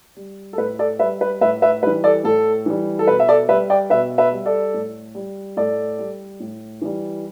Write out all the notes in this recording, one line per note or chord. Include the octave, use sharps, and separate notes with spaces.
G3
A4
A2 B4
A4 D5
G3 B4 E5
B4
A2 B4 E5
B4 E5
E3 G3 B4
A4 D5
A2 A4
E3 G3
A4
B2 B4
E5
A4 D5
G3 B4 E5
D5 G5
B2 B4 E5
B4 E5
G3
A4 D5
A2
G3
A2 A4 D5
G3
A2
E3 G3